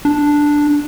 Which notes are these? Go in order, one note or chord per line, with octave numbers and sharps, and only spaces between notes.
D4